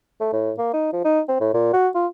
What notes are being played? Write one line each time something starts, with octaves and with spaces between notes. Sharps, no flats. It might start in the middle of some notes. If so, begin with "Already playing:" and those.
A3
A2
A#3
D#4
F3
D#4
C4
A2
A#2
F#4
F4